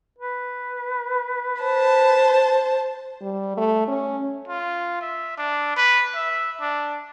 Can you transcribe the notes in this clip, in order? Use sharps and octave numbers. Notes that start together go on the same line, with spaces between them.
B4
C5 A5
G3
A3
C#4
F4
E5
D4
B4
E5
D4